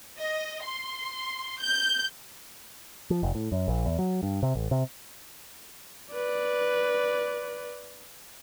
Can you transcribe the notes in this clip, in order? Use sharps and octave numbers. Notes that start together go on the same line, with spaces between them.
D#5
C6
G6
F3
F1
A2
F#2
A#1
E2
F#3
G2
C3
A1
C3
B4 D5